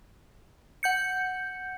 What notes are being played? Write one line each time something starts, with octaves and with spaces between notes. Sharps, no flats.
F#5 G6 C#7